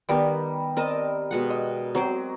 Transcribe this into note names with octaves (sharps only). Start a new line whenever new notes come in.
D#3 G3 B3 A#4 D6
C4 A#4 D#5 A5
B2 G#3 F#5
D#5
F#3 C4 C5 D6